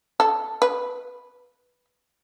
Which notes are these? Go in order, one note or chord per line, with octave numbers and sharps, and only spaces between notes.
A4
B4